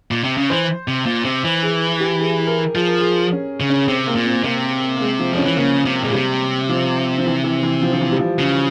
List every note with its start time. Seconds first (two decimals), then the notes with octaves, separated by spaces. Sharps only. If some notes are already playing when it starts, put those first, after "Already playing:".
0.11 A#2
0.23 C3
0.37 C#3
0.50 E3 C5
0.88 C3
1.06 A#2
1.25 C3
1.44 E3
1.63 G#4
2.00 G4
2.20 G#4
2.47 A#4
2.75 F3 G#4
2.87 A#4
3.00 G#4
3.32 C#4
3.60 C#3
3.70 C#4
3.88 C3 C4
4.07 A#3
4.15 A#2
4.26 C4
4.44 C3 A#3
4.97 A#3
5.01 G#3
5.19 F3
5.33 F3
5.38 C#4
5.45 E3
5.57 C#3 A#3
5.85 C3
6.03 A#2 G#3
6.13 C3 G3
6.69 F3
7.18 F3
7.26 E3
7.44 E3
7.63 E3
7.82 F3
7.93 F3
8.01 E3
8.12 G3
8.19 F3
8.39 C#3